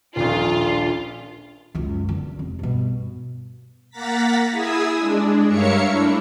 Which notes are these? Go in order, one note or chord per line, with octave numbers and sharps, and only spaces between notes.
D#1 A#1 D4 F4
C#2 F#2
E2 D3
F1
G2 B2
A#3 F#5 A#5 A6 B6
E4 G#4 G#5 D#6 E6
G#3 D4
G2 A#4 C#5 E5 F5 C#7
A3 D4 E4